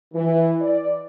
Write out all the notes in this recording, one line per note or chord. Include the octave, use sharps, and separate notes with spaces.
E3
D5